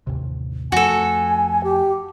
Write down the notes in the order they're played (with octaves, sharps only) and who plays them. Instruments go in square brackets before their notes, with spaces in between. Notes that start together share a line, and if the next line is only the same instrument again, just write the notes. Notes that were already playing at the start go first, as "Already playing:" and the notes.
[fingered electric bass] A1 D#2 C3
[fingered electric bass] F2 F3 A3 [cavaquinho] F#4 A4 [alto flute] G#5
[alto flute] G4